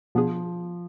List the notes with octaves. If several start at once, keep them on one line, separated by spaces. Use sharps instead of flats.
B2 F3 B3 D4 G#4